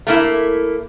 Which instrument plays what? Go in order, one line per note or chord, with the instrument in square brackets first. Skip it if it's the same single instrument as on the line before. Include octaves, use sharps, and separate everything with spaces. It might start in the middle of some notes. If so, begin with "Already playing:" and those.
[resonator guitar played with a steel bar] A3 A#3 E4